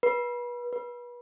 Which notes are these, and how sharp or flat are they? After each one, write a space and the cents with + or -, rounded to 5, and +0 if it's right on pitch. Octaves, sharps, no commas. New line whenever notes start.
B4 -30
B4 -30